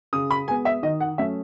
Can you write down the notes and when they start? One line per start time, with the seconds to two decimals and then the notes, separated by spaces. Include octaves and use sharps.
0.13 C#3 D#6
0.31 B5
0.48 G#3 G#5
0.50 B3
0.65 E5
0.83 D#3 D#5
1.00 F#5
1.18 F#3 A3 C#4 E5